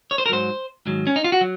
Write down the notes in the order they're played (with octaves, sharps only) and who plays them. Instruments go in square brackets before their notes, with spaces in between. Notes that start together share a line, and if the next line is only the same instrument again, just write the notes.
[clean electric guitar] C#5
C5
A#4
G#2 F#3 C5
G#2 D#3 F#3
C#4
D#4
F4
F#4
F#3